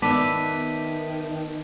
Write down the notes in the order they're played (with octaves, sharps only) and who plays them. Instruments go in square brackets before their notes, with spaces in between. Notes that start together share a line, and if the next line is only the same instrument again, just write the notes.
[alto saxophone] D#3 [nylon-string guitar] B3 [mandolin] D5 E5 [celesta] A5 B6 D#7